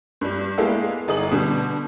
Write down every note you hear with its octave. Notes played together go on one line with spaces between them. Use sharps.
G2 G3
G#3 A#3 B3 E4 G4 A4
G1 D#4 G#4 D#6 F#7
B2 D3 G3